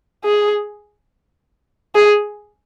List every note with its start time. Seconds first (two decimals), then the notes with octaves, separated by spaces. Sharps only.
0.25 G#4
1.95 G#4